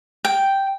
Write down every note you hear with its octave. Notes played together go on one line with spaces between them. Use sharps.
G5